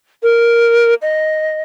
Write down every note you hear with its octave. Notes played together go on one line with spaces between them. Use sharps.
A#4
D#5